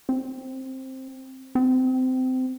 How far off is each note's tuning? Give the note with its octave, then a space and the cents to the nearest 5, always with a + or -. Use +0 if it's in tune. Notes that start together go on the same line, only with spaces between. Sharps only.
C4 +10
C4 -25